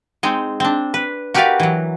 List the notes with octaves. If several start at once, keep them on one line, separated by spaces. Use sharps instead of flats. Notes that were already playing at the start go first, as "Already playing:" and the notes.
G#3 C4 D#4
C4 D4
B4
F#4 G4 A#4 B4 D5 F5
E3 F#3